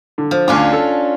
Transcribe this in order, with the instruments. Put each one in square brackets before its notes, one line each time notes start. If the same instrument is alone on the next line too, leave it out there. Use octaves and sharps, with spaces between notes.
[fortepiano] D3
[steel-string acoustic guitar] F3
[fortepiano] D2 F5 D6 [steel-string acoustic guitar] C#4 D4 F4
[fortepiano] A4